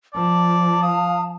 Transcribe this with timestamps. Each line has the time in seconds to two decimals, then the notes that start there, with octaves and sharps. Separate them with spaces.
0.15 F3 D5 A5
0.83 F5 D#6